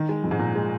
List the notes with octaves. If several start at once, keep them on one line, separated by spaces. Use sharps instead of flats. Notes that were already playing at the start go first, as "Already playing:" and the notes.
Already playing: D#3
G#3
F2
G#2
A#2
G#3